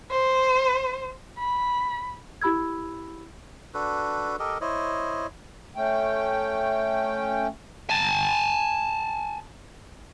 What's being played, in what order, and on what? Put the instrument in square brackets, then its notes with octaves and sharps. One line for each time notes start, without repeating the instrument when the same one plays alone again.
[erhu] C5
B5
[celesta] E4 G4 B5 E6 G#6
[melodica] D4 F#4 A4 B4
G4 A4 A#4 D#5
E4 C5 C#5 D#5
[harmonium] A3 C#4 G5
[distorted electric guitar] G#5 A5